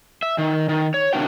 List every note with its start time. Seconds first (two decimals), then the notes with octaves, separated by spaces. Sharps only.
0.23 E5
0.38 D#3
0.69 D#3
0.94 C#5
1.13 C3 D#3 E3 D4 F#4 G5